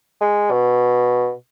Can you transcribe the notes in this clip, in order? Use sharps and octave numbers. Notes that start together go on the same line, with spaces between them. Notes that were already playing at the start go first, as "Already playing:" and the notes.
G#3
B2